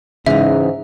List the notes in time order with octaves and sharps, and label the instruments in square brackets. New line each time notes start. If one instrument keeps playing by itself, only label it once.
[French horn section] G#2 [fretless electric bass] C#3 [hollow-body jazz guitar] E3 D#4 [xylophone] E5